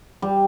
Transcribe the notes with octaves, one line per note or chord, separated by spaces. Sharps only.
G3